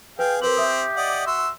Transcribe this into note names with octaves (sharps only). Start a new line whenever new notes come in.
G#4 B4 F5 G5
C4 G4 A#4 B4 F#7
E5 D#6
D5 D#5 F#5
F#4 E5 C6 E6